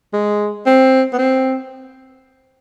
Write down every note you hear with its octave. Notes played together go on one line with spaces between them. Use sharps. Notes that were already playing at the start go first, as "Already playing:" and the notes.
G#3
C4
B3
C4